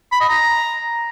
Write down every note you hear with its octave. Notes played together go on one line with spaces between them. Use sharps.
B5
D#5
A#5